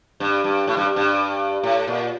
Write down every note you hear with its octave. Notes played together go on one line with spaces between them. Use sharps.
G2
G2
A2
G2
G2
A2
A#2